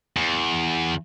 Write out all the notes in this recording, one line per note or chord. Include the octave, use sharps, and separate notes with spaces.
E2